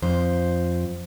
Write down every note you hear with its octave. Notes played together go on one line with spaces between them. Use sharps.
F2 C5